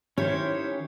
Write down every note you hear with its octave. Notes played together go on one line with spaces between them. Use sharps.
D#3 C#4 E4 G4 C5 C#5